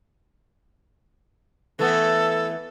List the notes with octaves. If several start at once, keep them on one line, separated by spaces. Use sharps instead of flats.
E3 A3 B3 A4